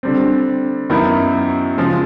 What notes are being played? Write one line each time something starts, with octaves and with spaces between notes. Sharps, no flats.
D3 G3 C4
F#2 D#3 F#3 B3 E4
C#3 F3 G#3